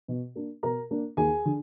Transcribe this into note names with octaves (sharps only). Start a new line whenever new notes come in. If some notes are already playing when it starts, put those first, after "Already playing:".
B2
A#3 D4
B2 A#4 A#5
A#3 D4
D#2 G#4 G#5
D3